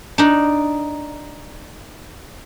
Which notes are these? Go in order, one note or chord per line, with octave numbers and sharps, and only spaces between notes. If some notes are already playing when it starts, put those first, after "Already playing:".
D4 D#4